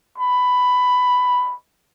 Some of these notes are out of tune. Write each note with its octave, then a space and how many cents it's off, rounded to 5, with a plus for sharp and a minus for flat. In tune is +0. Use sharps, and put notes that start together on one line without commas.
B5 +10